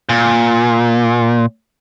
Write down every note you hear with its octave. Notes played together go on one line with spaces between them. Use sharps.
A#2